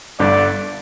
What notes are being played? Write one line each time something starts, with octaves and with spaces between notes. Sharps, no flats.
G1 G2 D3 D5